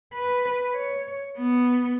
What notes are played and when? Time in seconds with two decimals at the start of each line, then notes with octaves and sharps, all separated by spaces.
0.14 B4
0.75 C#5
1.37 B3